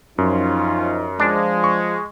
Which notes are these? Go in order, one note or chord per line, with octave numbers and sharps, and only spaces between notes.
F#2 F3 C#4 D#4 F4
F3 G#3 D4
C#6